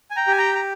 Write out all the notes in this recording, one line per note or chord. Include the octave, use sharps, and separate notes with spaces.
G#5
G5 A#5
G4 G#5
G5 A#5
A#5